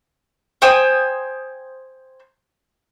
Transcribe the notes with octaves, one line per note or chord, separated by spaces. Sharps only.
C5 G5 G#5 D#6